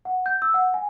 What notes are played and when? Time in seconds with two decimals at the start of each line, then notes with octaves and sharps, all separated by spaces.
0.05 F#5
0.26 G6
0.42 E6
0.54 F#5
0.74 G#5